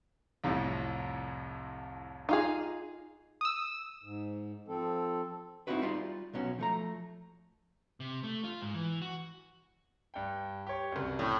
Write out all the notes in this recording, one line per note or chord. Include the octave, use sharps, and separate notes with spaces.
C2 F2 A2
D#4 F4 G#4
D#6 E6
G#2
F3 C4 A4
C4 C#4 D#4 E4 F#4 B4
G3 D#4 F4 D5 C6
B1 B2 F#3 C#4
F3 A3 A#5
C3
A3
F4
G#2
E3
F#4
G2 G5
G4 C#5
C2 F#2
A2